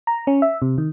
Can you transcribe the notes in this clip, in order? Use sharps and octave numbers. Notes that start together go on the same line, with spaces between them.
A#5
C#4
E5
C3
D#3